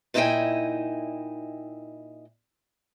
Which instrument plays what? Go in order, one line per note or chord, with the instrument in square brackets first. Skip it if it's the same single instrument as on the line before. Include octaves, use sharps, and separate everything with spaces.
[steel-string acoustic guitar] A#2 D#4 E4 D#5 G5 G#5